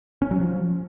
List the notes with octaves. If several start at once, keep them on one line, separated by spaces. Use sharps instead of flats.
C#4
F#3
F3